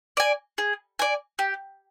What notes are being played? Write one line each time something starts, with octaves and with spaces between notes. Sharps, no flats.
D5 G#5
G#4
D5 G#5
G4